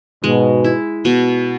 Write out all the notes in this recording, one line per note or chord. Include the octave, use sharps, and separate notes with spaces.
G#2 B2 G#3
E4
B2